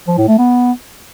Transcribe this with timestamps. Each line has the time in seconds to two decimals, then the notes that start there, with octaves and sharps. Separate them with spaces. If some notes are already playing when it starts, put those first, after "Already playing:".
0.08 F3
0.18 A2
0.28 A3
0.39 B3